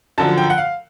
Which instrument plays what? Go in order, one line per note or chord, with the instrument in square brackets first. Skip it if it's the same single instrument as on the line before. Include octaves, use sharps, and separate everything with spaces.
[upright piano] F#2 D3 F3 A5
G5
F#5
F5